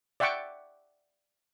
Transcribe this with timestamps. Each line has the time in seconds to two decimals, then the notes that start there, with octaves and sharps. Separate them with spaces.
0.20 D5 E5 F#5 G5 C#6 D6